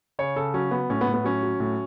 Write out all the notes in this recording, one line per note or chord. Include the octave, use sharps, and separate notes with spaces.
C#3 C#5
C#3 A4
F#3 C#4
F#3 B3
A2 C#4
B3
A2
B3
F#3 C#4
F#3
A2